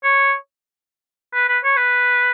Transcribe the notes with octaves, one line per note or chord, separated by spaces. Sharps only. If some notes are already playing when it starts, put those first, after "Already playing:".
C#5
B4
B4
C#5
B4